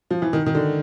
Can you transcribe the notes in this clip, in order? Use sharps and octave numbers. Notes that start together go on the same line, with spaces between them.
F3
E3
D#3
D#3
D3